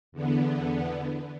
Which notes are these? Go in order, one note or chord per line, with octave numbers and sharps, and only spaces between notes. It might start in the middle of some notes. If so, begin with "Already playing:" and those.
E2 D3 B3